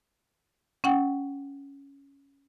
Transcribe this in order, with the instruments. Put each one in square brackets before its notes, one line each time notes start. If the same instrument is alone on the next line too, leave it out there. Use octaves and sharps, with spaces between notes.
[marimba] C#4 F#5 G5